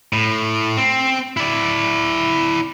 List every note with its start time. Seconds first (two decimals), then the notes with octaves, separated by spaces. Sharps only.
0.13 A2
0.77 C4
1.37 E4 D5